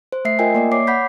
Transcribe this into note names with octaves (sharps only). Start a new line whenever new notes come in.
C5
A3 E5 C7
F4 A#4 D#5 G5 G#5
A#3 D5 E5
C#5 D6 C7
F#5 B5 G6 B6